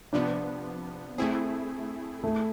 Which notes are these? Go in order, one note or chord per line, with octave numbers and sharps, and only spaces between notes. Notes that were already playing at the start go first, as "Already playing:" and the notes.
C3 F3 B3 D4
A3 C4 E4 G#4
A3